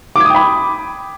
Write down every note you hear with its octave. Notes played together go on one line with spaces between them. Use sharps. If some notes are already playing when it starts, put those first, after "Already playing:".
G5 B5 D6 D#6 G#6